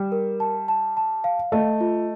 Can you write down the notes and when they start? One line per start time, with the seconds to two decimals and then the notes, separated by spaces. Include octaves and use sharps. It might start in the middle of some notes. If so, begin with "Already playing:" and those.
Already playing: G3
0.12 A#4
0.40 A5
0.68 A5
0.97 A5
1.24 F5
1.52 A3 D#5
1.81 F4